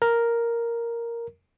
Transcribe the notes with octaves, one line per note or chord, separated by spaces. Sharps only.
A#4